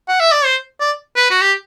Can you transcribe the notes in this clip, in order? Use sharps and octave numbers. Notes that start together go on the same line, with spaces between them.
F#5
E5
D5
C5
D5
B4
F#4
G4